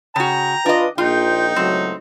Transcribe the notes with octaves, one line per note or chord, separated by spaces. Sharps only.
C#3 F#4 G5 A#5
D4 F4 B4 D#5
A#1 D#4 F4 G5
C#2 A2 F#3 C4